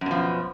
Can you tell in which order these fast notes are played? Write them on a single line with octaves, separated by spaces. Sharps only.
F#2 B2 F3